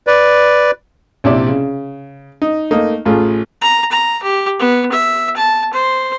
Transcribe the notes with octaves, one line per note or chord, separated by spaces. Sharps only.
B4 D5
A#1 C3 E4 D5
C#3
D#4
A3 A#3 D#4
A1 A3 F4 G#4
A#5
A#5
G4
B3
E5
A5
C5